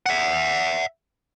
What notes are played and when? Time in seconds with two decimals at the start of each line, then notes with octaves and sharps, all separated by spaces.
0.06 E5 F#5